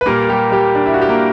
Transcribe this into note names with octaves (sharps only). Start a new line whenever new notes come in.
B4
A#2 G3 A#3 A#4
G3 G4
G3 G4
D4
E4
F#4
G4
A#3 A#4